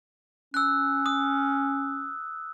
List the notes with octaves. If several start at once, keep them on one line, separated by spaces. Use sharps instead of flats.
C#4 E6 F#6
D#6